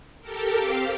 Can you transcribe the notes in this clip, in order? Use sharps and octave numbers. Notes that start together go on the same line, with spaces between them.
G4 A4 A#4
C4 G4 F5 D6